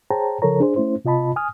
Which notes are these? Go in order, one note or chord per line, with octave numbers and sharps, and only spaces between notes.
G#4 C5 C#5 G5 A5 A#5
C#3 F3 A4 A#4 C#5 A#5
D4 G#4 C5
A3 C#4 E4 C5
C3 F4 D#5 A5 B5
G#5 D#6 F6